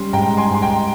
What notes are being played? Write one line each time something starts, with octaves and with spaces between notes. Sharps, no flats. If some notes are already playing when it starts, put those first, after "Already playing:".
Already playing: G3 C#4 C6
G#2 G5 A#5
G#5 C6
G#2 C6
G5 A#5